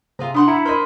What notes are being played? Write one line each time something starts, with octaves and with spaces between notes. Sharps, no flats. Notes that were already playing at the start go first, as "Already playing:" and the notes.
C3 F4 G#4 A#5
D4 F#5 C6 D#6
E4 E5 A#5 C#7
A#4 C5 D#5 B5 C6